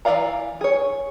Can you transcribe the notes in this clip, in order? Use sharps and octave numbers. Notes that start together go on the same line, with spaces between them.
E3 A4 D5 F5 A#5
G#4 C#5